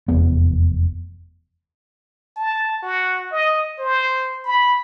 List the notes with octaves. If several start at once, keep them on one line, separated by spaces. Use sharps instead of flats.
F1 E2 B3
A5
F#4
D#5
C5
B5